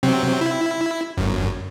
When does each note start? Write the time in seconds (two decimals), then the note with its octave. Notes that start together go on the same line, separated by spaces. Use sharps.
0.03 C3 F#3 C4
0.41 E4
1.17 G1 F#2